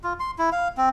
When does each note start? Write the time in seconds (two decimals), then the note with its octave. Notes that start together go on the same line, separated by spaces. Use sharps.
0.04 F4
0.20 C6
0.38 E4
0.52 F5
0.77 C4